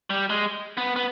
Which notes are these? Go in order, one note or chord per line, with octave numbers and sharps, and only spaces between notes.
G3
G#3
B3
B3